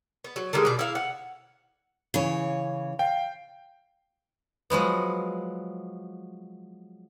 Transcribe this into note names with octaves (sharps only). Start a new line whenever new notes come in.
B3
F#3
D3 D#3 G3 G#3
B2 D5
E4 F5
F#5
C#3 E3 C#5
F5 G5
F3 F#3 G#3 B3